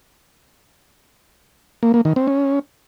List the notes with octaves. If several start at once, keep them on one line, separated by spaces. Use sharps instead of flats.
A#3
A#3
D#3
C4
C#4